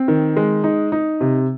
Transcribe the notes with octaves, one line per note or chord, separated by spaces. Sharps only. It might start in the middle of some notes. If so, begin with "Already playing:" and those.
Already playing: C4
D#3
G#3
D#4
D#4
C3